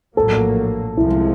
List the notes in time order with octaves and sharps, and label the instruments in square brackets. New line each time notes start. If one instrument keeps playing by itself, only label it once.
[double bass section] A#1 A2 F#3 A#3 [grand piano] A4
[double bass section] C2 C3 F3 G#3 [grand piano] E4